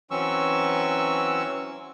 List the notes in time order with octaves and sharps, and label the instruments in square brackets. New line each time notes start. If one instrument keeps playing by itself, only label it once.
[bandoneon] E3 F#3 C4 C#4 C#6 E6